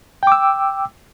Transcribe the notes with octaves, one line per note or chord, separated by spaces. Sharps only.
G5 D6 E6